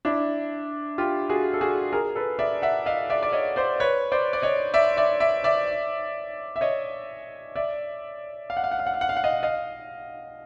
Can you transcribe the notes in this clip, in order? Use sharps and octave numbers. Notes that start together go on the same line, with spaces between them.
D4 E4
F4 G4
F#4 G#4
A4
F#4 G#4
G#4 A#4
A4 B4
D5 E5
E5 F#5
D#5 F5
D5 E5
D5
C#5 D#5
C5 D5
B4 C#5
C5 D5
D5
C#5 D#5
D5 E5
D5 E5
D5 E5
D5 E5
E5
C#5 D#5
D5 E5
F5
F#5
F5
F#5
F5
F#5
F5
F#5
F5
F#5
D#5 F5
D#5 F5